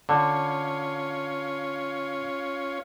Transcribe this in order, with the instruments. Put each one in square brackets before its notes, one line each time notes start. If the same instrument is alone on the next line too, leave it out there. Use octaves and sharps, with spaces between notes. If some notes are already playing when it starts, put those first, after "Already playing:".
[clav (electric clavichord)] D3 [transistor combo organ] C#4 F4 C#5